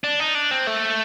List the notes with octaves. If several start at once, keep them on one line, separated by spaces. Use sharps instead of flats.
D4
D#4
D4
C4
A3